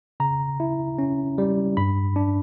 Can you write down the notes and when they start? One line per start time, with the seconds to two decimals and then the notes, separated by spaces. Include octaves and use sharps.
0.20 C#3 A#5
0.60 E4
0.99 C#4
1.38 G3
1.77 G2 B5
2.16 D4